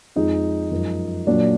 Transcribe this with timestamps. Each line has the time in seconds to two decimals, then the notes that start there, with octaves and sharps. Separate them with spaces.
0.16 F2 F3 G#3 D#4
0.71 F#2 F3 G#3
1.27 A#2 F#3 D4